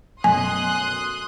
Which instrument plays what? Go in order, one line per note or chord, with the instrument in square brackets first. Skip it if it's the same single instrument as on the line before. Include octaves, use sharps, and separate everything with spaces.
[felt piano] F#2 B2 A3 [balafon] G#5 [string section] C6 D#6 F#6